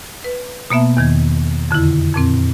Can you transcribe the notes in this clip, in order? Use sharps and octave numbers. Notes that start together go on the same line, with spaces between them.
B4
B2 A#3 B3 E5 A5
E2 D#3 G#6
F2 D3 D#3 E4
F2 A#2 C4